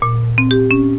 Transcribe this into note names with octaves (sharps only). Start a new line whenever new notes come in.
A#2
C4
G4
C#4